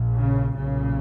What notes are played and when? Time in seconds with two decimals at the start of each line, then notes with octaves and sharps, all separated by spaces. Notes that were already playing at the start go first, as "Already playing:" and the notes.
Already playing: A#1 A#2
0.16 C#3
0.58 B1 A#2 C#3